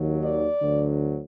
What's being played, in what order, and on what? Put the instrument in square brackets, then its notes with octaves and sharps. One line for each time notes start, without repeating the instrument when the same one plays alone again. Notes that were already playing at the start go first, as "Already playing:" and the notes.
Already playing: [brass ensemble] D#2 D#3 F#3
D5
D2 D3 F#3